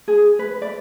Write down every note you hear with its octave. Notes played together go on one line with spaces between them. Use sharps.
G#4
B4
D5